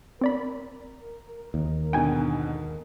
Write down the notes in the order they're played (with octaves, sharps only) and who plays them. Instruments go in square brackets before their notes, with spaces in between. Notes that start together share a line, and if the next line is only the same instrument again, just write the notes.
[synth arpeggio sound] C4 D5 B5 [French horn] A#4
[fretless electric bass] D#2
[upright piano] G#2 B2 D3 [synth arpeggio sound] G5 G#5